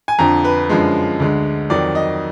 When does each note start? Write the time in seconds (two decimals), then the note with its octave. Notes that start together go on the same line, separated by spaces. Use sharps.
0.08 G#5
0.19 F2 D3 F3 A#5
0.45 B4
0.69 F#2 D3 F3 G#3
1.20 D2 D3 G#3
1.70 F2 D#3 F#3 D5
1.95 D#5